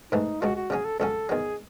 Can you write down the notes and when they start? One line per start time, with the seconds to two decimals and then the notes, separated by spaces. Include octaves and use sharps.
0.12 G#2 E3 A3 D#4
0.41 C#2 C#3 G#3 F#4
0.56 F#4
0.70 C#3 F#3 C#4 G#4
0.85 A4
1.00 C#2 C#3 F#3 C#4 A4
1.29 E2 D#3 F#3 G#4